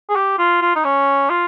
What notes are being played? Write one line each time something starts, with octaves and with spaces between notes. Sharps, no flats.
G#4
G4
F4
F4
D#4
C#4
F4